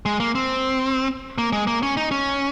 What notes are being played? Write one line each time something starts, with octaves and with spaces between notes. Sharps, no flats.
G#3
A#3
C4
A#3
G#3
A#3
C#4
D#4
C#4